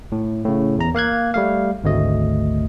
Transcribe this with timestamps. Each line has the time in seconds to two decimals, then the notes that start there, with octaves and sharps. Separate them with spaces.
0.12 A2
0.44 A2 C#3
0.78 E2 A#5
0.95 A#3 F5 F#6 G#6
1.34 G3 A3 F5
1.84 G#1 D2 A3 D#5